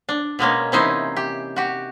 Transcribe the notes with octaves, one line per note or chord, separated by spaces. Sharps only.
D4
B2 G#3 A#3 C#4
C3 E3 C#4 D#4 E4 C5
G4
F#4 G4